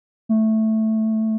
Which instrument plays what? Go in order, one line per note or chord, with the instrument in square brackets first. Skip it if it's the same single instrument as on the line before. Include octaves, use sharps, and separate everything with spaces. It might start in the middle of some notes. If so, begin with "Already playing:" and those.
[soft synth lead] A3